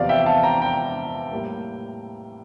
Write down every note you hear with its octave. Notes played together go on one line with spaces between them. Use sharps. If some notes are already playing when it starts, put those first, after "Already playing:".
Already playing: E2 C3 F3 D5 F5
E5 G5
F5 A5
G5 A#5
G5 A#5
A2 G3 A#3